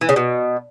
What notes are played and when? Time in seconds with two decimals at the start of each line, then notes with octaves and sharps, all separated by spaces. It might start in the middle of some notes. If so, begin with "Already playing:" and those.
0.01 E3
0.09 C#3
0.16 B2